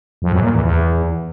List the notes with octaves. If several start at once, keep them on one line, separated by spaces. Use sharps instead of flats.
F2
F#2
A#2
E2
E2